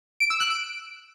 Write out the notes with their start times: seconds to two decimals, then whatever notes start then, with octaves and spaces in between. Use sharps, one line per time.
0.20 D7
0.30 E6
0.40 F#6
0.50 D7